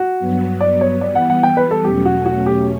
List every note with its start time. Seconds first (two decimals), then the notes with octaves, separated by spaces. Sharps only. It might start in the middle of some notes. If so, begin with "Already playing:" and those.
Already playing: F#4
0.19 G2 F#3 B3
0.61 D5
0.81 C#5
1.01 E3 G3 B3 D5
1.15 F#5
1.30 F#5
1.43 G5
1.57 B4
1.71 A4
1.85 E2 B2 F#3 A3 C#4 G4
2.05 F#4
2.26 F#4
2.46 G4